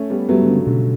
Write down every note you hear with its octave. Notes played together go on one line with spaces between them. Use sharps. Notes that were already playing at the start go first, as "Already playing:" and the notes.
Already playing: A3 C#4
G3 B3
F#3 G3 A3 B3
D3
C#3
B2 D3